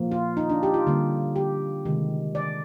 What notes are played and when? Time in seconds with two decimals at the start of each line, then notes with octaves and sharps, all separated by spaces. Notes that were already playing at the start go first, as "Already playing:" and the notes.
Already playing: A#2 F3 A#3
0.12 F4
0.37 D#4
0.50 D4
0.63 G4
0.74 F4
0.87 D3 G3 A#3
1.36 G4
1.85 C3 D#3 G#3
2.35 D5